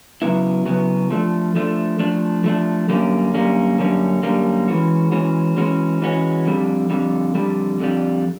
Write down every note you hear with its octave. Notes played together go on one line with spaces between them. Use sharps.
C#3 F#3 B3 E4
C#3 F#3 B3 E4
F3 A3 D4
F3 A3 D4
F3 A3 D4
F3 A3 D4
F#2 D3 G3 A#3 C#4
F#2 D3 G3 A#3 C#4
F#2 D3 G3 A#3 C#4
F#2 D3 G3 A#3 C#4
E3 G#3 C#4 F#4
E3 G#3 C#4 F#4
E3 G#3 C#4 F#4
E3 G#3 C#4 F#4
F2 D3 G3
F2 D3 G3
F2 D3 G3
F2 D3 G3